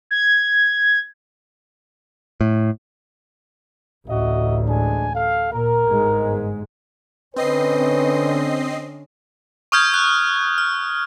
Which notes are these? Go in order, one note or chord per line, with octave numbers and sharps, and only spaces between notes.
G#6
A2
A1 D2 F#4 D#5 E5
G#3 D4 G#5
A4 F5
A#2 A#4
G1 G#2 G#3
D3 C4 C#4 B4 D#5 C7
C#6 D#6 F6 G6 G#6
F#6
F6